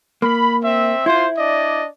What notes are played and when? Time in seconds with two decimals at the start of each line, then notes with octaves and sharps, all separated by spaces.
0.22 A#3 B5
0.63 C4 E5
1.06 E4 F4 C5
1.37 D4 D5 D#5